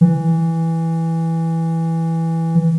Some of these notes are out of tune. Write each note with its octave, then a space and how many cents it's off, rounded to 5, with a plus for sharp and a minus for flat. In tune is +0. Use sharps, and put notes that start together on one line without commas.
E3 -5